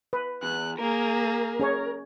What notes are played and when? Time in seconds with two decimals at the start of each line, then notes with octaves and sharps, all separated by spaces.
0.13 B4
0.43 E2 F#6
0.79 A#3 G#4 A#4
1.60 C#4 G#4 C#5